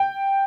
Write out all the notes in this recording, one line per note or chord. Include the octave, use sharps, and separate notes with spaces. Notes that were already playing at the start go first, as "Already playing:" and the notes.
Already playing: G5